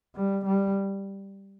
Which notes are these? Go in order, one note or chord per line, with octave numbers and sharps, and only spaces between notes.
G3
G3